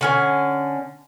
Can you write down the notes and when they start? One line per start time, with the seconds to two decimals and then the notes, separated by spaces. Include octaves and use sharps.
0.01 D3 C#4 G#5